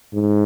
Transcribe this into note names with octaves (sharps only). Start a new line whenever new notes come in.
G#2